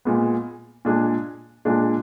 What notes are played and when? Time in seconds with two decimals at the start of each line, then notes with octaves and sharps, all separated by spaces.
0.05 A#2 G#3 B3
0.85 A#2 G#3 D4 G#4
1.65 A#2 G#3 D4